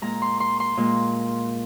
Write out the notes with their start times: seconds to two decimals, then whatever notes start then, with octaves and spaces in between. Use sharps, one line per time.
0.02 A#2 G#3 A#5
0.22 C6
0.40 C6
0.60 C6
0.77 A#2 G#3